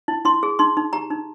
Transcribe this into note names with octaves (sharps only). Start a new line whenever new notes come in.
E4
E4 C6
G#4
D#4 C6
D#4
G4 A#5
D#4